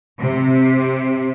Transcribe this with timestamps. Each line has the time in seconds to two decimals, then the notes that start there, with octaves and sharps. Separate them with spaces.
0.20 C3